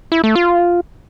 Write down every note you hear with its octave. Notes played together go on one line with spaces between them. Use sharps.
E4
A3
F4